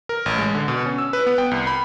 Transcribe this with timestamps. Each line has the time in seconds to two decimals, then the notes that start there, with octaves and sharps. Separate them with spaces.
0.09 A#4
0.26 A1
0.38 G#3
0.55 D3
0.68 B2
0.86 C#4
0.98 E6
1.13 B4
1.26 B3
1.38 G5
1.51 C2
1.67 B5